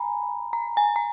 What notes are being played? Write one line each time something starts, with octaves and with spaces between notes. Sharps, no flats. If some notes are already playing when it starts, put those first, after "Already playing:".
Already playing: G#5 A#5 B5
A#5
G#5
A#5